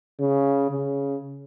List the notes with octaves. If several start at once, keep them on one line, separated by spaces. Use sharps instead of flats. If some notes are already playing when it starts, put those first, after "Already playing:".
C#3
C#3